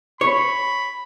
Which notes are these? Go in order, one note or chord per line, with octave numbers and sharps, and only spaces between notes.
C#5 B5